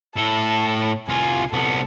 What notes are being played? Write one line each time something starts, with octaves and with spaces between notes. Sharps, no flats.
A2 A4 A5
C2 F4 G#5
C2 B3 A4